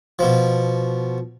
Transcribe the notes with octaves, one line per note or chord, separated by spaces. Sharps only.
B2 F3